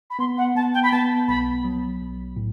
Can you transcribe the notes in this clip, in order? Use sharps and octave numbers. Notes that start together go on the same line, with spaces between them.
B5
B3 C6
F#5
B3 A5
G5
B5
B3 A5
B1 B5
F#3
B1
A2